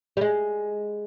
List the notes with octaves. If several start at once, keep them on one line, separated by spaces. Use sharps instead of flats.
G3
G#3